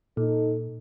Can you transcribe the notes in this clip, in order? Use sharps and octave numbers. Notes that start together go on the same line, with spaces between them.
A#2 D#4 A4